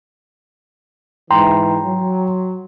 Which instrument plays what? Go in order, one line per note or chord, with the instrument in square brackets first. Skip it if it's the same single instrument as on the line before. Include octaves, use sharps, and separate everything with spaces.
[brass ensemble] G#2 E3 [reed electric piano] G5 A#5 C6
[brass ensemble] F#3